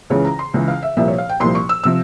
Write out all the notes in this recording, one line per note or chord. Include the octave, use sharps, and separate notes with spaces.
C#2 C#3 E3 C#5
A#5
C6
C#2 C#3 E3
F5
E5
C2 A#2 F3 E5
C#5
F5
G5
C2 A#2 F3 C6
C#6
E6
C3 F3 E6